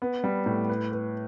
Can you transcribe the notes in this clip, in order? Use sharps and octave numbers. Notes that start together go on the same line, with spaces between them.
B3
G3
A2
B4
B4